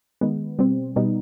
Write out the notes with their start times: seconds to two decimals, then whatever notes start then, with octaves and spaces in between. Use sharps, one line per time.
0.21 D#3 G#3 B3
0.59 B2 G3 C4
0.96 B2 G3 B3 D#4